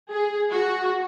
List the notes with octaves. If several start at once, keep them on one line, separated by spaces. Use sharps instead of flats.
G#4
F#4